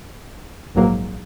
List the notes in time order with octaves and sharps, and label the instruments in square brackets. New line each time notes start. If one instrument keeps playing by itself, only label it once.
[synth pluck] A#1 G#2 F#3 A#3